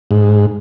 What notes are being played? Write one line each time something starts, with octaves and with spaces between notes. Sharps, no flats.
G#2